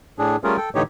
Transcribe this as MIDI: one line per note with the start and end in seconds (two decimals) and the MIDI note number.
0.19 0.36 45
0.19 0.36 62
0.19 0.36 68
0.44 0.57 55
0.44 0.57 57
0.44 0.57 61
0.44 0.57 65
0.44 0.57 68
0.44 0.57 70
0.57 0.69 69
0.57 0.69 79
0.75 0.82 45
0.75 0.82 50
0.75 0.82 52
0.75 0.82 63
0.75 0.82 67
0.75 0.82 73